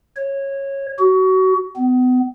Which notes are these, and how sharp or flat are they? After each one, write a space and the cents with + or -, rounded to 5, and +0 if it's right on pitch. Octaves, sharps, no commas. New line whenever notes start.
C#5 -15
F#4 +25
B3 +35